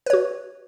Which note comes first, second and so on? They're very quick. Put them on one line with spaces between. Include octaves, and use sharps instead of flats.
B4 C#5 F#4